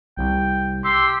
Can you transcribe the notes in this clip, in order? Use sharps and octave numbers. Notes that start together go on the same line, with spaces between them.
C2 G5
G4 C6 E6